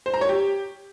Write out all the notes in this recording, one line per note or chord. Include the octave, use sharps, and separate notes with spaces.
C5
A#5
C#5
G4